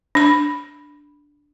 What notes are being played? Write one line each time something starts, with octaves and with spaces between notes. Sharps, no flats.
D4 B5